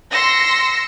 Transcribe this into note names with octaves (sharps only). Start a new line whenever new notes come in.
C6 E6 A#6 C#7